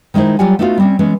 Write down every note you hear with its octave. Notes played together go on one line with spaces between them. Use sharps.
D#3 G#3 D#4 E4 C5
F#3 G3 F4 G4 F#5 G#5
A3 B3 D#4 F4 F#4 F5
G3 C4 C#4
E3 G#3 B3 C#4